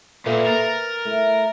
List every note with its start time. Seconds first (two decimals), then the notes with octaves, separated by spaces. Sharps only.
0.26 A#2 A4 B4 E5
0.46 A#4 A6
1.05 A3 E4